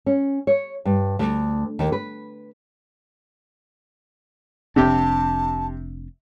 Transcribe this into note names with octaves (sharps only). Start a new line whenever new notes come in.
C#4
C#5
G2
D2
D#2
B4
F1 C3 C4 D4 G4 A5